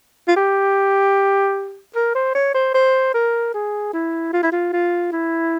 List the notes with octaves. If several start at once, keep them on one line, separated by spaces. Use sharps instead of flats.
F4
G4
A#4
C5
C#5
C5
C5
A#4
G#4
E4
F4
E4
F4
F4
E4